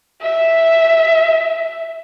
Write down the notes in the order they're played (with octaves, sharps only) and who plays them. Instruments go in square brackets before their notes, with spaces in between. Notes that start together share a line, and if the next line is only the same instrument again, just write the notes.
[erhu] E5